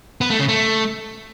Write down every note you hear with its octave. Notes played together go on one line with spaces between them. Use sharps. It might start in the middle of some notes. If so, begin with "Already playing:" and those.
B3
A3
C#3
A3